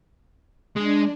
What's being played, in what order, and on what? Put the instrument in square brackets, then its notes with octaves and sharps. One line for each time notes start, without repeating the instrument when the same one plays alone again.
[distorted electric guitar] G#3 [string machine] D4